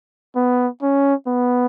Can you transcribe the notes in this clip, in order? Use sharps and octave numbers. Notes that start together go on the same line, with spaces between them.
B3
C#4
B3